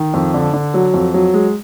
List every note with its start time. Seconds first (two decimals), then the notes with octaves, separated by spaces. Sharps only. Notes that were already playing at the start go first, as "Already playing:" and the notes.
Already playing: D#3
0.14 F2
0.34 D3
0.54 D3
0.74 F#3
0.94 F2
1.14 F#3
1.34 G#3